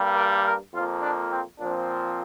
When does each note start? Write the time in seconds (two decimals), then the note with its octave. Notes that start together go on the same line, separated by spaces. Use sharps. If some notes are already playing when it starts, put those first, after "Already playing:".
Already playing: G2 G3 A#3
0.16 A#4
0.44 A#4
0.73 F2 F3 A#3 F4
1.02 D4
1.31 C4
1.59 A#2 F3 C4 D4